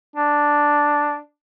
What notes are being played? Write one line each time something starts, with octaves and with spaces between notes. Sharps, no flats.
D4